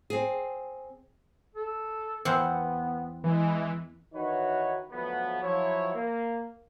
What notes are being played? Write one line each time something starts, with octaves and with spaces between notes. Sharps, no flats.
C4 G#4
A4
E2 B3 C4 F#5
E3 G#3
D#3 E3 D#4 F#4 B4 C#5
D2 F3 F#3 A3 B3
F3 F#3 E4 C#5
A#3